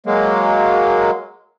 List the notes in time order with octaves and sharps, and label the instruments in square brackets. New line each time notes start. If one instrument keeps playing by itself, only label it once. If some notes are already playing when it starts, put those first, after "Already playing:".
[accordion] F#3 G#3 A#3